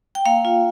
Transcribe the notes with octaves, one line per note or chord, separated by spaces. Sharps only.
G5
A#3 F5
F4